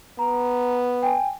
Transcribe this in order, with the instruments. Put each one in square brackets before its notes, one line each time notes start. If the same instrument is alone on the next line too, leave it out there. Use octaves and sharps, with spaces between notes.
[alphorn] B3 [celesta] A#5
[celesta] G5 G#5